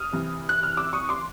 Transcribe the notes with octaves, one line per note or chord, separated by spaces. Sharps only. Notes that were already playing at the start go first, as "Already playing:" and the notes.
Already playing: D#6 F6
C3 E3
F#6
F6
D6 E6
C#6 D#6
C6 D6